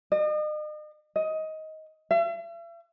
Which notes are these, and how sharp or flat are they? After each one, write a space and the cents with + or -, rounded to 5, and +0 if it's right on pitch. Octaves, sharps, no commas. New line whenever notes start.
D#5 -40
D#5 +15
E5 +45